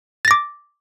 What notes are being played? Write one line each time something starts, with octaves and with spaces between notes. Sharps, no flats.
D6 A6 A#6